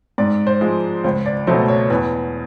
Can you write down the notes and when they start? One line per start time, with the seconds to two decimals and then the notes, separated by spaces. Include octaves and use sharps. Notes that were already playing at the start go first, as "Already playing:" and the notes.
0.18 G#2 D5
0.47 C5
0.61 F3 G#3
1.04 C#2 C5
1.26 D5
1.47 B2 F#3 A3 C5
1.68 C#5
1.90 E2 B4